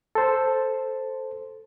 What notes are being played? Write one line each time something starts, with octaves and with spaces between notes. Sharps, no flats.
A4 C5